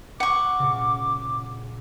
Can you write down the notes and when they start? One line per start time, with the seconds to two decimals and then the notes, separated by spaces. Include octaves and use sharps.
0.20 F#5 C#6 D6
0.59 A#2 C#3